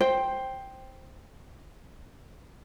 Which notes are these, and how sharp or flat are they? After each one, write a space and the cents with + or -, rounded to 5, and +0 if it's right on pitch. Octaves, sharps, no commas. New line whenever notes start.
C5 +10 G5 +0